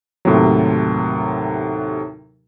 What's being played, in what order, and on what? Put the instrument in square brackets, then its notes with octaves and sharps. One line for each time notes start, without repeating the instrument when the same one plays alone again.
[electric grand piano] D#2 A2 C3 F#3